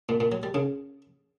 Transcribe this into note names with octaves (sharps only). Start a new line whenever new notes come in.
A#2
A#2
F#3
G3
C#3